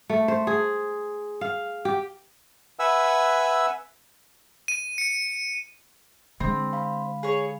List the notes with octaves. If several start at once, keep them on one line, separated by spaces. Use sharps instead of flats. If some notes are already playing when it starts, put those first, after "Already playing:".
A3
C5
G#4
F5
G4
B4 E5 F#5 G#5 E6
D#7
C#7
D3 G#3 C4 B5
F5 B5
G#4 C#5